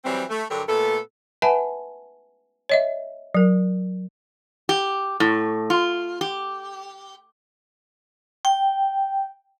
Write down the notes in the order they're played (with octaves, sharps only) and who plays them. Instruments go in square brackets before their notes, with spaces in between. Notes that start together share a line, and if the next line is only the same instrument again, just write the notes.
[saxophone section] E3 F#3 G3 C4
A3
G2 D3 F#3 G4 A4 A#4
A#2 A3 B3 A4
[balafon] B4 E5 F#5 G#5 A5 B5
C#5 D#5 E5
F#3 A#4
[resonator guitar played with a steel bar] G4
A2
F4
G4
[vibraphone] G5